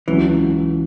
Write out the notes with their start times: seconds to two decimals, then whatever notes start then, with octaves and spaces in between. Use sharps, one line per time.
0.07 C#2 C#3 E3 F#3